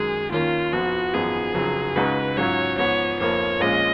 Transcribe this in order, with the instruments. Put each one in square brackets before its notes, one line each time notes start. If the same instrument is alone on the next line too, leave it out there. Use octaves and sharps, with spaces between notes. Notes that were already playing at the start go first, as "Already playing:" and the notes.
Already playing: [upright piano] F#2 D#3 G#3 [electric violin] G#4
[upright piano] D#2 D#3 A#3 C#4 [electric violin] F4
[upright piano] F1 F2 F3 B3 [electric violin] F#4
[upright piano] G#1 F#2 F3 B3 D#4 [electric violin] G#4
[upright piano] F1 F2 C#3 F#3
[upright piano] C#2 C#3 G#3 D#4 F#4 [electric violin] B4
[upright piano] G#2 F#3 C#4 F4 [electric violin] C#5
[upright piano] G#2 F3 B3 [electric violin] C#5
[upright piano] F1 F2 F3 A#3 [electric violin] C#5
[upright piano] A#1 A#2 G#3 C#4 F4 [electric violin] D#5